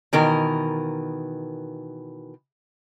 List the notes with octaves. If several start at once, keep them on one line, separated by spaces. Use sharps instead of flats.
B2 D#3 E3 A#4